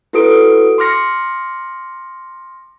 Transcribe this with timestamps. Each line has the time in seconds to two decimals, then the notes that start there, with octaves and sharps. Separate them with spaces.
0.13 E4 F#4 A4 B4 D#6 D7
0.78 C6 D6 F6 A#6 C#7